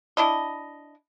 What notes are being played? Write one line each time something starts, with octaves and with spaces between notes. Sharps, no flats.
D4 E4 D#5